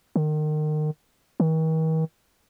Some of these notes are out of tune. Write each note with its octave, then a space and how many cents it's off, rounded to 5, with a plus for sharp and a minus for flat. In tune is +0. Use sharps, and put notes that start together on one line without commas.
D#3 -30
D#3 +45